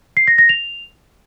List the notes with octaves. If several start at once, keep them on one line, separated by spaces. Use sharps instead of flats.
C7
A#6
A#6
F7